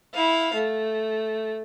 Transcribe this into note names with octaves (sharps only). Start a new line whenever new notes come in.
E4 F5
A3